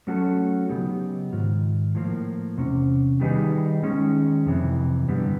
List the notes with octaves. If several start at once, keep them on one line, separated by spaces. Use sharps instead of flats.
F#3 A3 C#4 F#4 A4
C#3 F#3 B3 D#4 G4
G#2 D#3 F4
A2 F3 A#3
E2 C3 C#4
D#3 G3 B3 D#4 G#4
D#3 G#3 C#4
F2 C3 E3
G2 D3 G3 B3